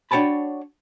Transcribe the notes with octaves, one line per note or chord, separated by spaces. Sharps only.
D4 F#4 C#5 G5 A5 B5